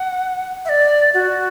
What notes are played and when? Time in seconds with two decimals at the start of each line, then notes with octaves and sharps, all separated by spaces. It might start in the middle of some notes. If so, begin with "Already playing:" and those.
Already playing: F#5
0.65 E5
0.69 D5
1.14 F#4